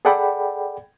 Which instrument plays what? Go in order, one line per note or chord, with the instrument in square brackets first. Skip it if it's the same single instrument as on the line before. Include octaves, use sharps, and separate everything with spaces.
[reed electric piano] G#4 A4 D5 F#5 G5 B5